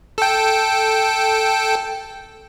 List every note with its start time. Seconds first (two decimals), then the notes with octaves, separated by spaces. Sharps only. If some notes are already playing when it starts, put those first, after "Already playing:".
0.18 A4 G5